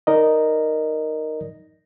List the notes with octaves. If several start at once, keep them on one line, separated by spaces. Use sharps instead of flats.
D#4 A#4 D5 D#5